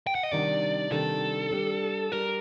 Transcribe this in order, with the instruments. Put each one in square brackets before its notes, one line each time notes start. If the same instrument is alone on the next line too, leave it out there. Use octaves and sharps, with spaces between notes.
[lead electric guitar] G5
F#5
D#5
[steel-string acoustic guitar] C3 D#3 G3 D4 [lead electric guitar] D5
[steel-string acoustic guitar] C3 D#3 G3 D4 [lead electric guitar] A4
[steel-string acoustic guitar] G3 D4 G4
[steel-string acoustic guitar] G3 D4 G4 [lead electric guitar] A#4